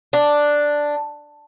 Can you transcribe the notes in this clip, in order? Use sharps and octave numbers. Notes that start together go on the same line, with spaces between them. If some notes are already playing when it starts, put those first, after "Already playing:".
D4